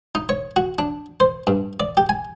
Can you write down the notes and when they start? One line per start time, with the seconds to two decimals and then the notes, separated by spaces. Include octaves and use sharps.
0.15 D#4
0.29 C#5
0.56 F#4
0.79 D4
1.20 C5
1.47 G2
1.80 D5
1.97 G4
2.09 G#5